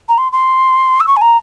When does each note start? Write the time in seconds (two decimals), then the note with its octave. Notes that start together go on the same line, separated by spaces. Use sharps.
0.08 A#5
0.18 C6
0.32 C6
1.00 E6
1.07 C#6
1.16 G#5
1.21 A#5